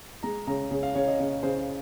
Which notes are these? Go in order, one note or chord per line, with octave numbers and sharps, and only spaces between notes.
G#3 A#5
C#3 A#5
C#3
F5
C#3 C#5
D#5
C#3 C#5
C#3 C5